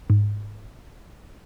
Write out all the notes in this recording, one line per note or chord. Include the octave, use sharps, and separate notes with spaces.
G#2